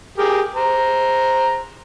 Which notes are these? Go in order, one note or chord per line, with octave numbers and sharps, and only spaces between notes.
G4 G#4 A#4
C5 A#5